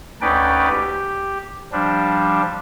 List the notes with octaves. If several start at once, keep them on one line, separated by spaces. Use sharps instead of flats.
D2 C#4 D#4 B4 D5 G5
G4
F3 G3 D4